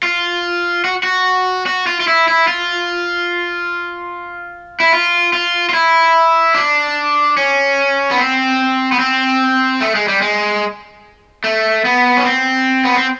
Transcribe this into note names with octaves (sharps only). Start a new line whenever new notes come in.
F4
F#4
F#4
F#4
F4
F4
E4
E4
F4
E4
F4
F4
F4
E4
D4
C#4
B3
C4
B3
C4
A3
G#3
G3
G#3
A3
B3
C#4
C4
B3
C4